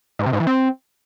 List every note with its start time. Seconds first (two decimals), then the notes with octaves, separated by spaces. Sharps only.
0.19 G#2
0.26 C3
0.33 G#2
0.40 E3
0.47 C4